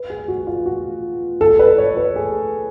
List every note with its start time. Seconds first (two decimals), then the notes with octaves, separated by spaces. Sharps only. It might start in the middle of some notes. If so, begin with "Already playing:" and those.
Already playing: B4
0.10 G#4
0.28 F#4
0.47 F4
0.66 F#4
1.41 A4
1.59 B4
1.78 C#5
1.97 B4
2.16 G#4